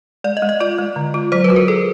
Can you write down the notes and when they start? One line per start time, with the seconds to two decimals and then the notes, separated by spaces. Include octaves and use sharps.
0.24 G#3 D5
0.37 D#5
0.42 G#3
0.49 D#5
0.60 F4 D5
0.78 G#3
0.96 D3
1.14 F4
1.32 F#3 C5
1.44 B4
1.50 F#4
1.56 A#4
1.68 G#4 A4